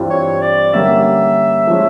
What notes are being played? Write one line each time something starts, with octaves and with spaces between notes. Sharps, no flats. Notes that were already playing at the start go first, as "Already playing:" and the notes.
Already playing: G2 E3 G3 C4 F4
C#5
D5
D3 G3 A#3 C#4 E5
F3 G#3 C#4